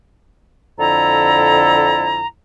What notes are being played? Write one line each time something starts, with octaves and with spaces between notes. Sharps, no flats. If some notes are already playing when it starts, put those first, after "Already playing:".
F2 D3 E4 A4 A#5